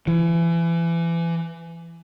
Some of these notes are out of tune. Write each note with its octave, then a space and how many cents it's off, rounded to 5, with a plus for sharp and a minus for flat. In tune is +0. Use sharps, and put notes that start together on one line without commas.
E3 +30